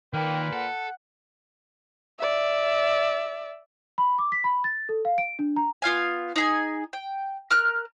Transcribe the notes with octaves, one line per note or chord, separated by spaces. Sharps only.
A#2 D#3 A#3 B4 G5
A4 F#5
D5 E5
B5
D6
B6
B5
A6
A4
F5
D7
D4
A#5
B3 F4 F5 G#5
D#4 G#4 G#5
G5
A#4 F6 F#6